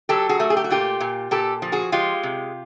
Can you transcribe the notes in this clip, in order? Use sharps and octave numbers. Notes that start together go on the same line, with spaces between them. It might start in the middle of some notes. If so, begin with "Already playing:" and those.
F#3 G4 A4
F#4 G#4
A3
G#4
G4
F#4
A#2 F4 G4
A#2
A#2 G4 A4
F3
F#4 G#4
G#3 F4 G4
C3